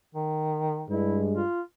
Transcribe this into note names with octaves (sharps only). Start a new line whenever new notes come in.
D#3
G2 G#3 E4
F4